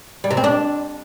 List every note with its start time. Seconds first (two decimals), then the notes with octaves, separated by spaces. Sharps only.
0.24 G3
0.31 C3
0.37 C4
0.44 D4